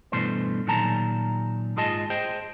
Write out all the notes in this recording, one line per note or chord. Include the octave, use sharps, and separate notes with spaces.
G2 B2 E3 A3 C5
A#2 D#3 F#3 G#4 A5 A#5
G#2 F4 G#4 D#5 A5
G#4 C5 D#5 G5